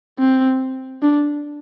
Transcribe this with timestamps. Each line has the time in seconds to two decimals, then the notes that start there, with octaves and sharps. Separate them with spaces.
0.19 C4
1.02 D4